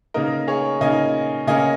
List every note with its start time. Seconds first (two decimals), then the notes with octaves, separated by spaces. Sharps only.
0.14 C#3 A#3 D#4 A#4 D#5
0.48 G#4 C#5
0.81 C#3 A#3 D#4 D#5 G#5
1.47 C#3 A#3 C#4 D#5 G#5